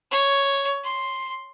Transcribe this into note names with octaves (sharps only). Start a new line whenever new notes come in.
C#5
C6